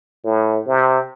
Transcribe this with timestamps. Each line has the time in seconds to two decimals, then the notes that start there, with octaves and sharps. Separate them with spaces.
0.24 A2
0.67 C3